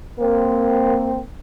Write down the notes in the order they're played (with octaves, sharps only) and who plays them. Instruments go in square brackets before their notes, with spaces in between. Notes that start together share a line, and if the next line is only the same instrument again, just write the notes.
[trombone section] A#3 C4